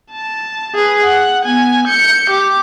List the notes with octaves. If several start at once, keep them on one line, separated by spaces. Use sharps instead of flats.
A5
G#4 B4
F#5
B3 G#5
G6 C#7
G4 D6